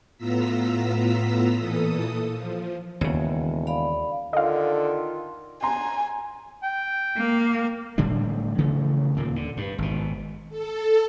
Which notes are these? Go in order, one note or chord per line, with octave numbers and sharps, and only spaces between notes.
A2 B3 F4 A#5 E6 B6
A#2 E3 A4 D#6
F3
E1 D#2 C#3 C#5
D5 F5 B5
D3 D#3 F4 D#5 F5
G#5 A#5 C6
G5
A#3
A2 D3 G3 D4
C#3 E3 A3 C#4
D#2 A#2 A#3
D3
G2
G#1 B2
A4